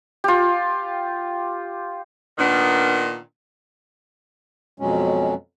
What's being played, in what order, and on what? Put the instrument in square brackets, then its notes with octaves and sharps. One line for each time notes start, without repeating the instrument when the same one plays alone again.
[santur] F4 G4
[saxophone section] A#2 D#3 B3 D4
[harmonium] F2 B2 F#3 G#3 C#4